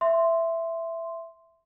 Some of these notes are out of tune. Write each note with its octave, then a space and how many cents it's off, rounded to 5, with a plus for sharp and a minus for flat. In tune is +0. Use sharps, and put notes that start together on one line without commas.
E5 +10 C6 -5